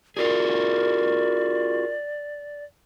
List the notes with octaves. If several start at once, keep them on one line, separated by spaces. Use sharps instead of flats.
F4 F#4 G#4 A#4 D5